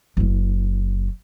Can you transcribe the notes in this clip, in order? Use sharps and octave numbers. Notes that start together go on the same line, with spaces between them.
F#1 E4